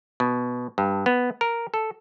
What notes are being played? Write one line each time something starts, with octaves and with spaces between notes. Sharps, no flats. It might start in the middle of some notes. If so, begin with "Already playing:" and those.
B2
G2
B3
A#4
A4